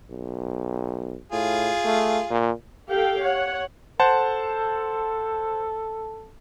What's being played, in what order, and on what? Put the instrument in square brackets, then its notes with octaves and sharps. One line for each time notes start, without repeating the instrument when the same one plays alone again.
[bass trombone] B1
[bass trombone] A2 [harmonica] F4 G#4
[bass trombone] A3
A#2
[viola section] G4 A4 F5 G5
C#5 F#5
[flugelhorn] A4 [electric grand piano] C5 F#5 A5